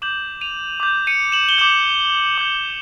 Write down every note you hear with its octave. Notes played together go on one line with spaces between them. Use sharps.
D6 G6 E7 F#7
D#7 F7
D6 G6
C#7 D#7
E7 F#7
G7
D6 G6 E7 F#7
D6 G6